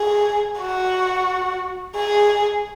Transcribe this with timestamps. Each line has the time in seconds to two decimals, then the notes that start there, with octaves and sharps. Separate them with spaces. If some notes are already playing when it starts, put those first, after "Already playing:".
Already playing: G#4
0.59 F#4
1.96 G#4